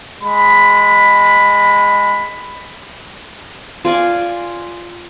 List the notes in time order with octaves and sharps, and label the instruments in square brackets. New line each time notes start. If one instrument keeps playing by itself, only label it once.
[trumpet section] G#3 B5
[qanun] F4 D5 G#5